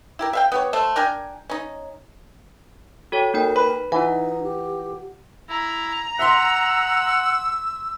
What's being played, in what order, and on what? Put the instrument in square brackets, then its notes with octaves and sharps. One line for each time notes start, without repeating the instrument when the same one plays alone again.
[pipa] E4 G4 A#4
E5 F5 G5
B3 G4 C#5
A3 A4 C5
D4 A#4 G5 G#5
C#4 D#4
[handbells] F#4 A4 C#5 [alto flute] G5
[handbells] A#3 D#4 G5 [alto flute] A#4
[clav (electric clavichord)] B4 [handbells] B5
[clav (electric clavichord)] E3 [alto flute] D#4 [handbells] F4 F#5
[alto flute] G4
[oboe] E4 [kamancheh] A#5
[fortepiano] E5 C6 [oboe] F#5 [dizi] E6